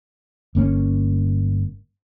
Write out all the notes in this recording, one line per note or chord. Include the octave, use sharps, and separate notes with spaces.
G1 A#3 C#4